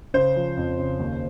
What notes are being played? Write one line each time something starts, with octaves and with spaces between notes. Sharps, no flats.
C#3 C5
F3
F2
C#3
D#2